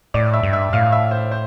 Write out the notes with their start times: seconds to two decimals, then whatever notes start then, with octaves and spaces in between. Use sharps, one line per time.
0.14 A2 D5
0.33 E5
0.43 G2
0.53 E5
0.73 A2 F5
0.92 E5
1.11 C5
1.31 C5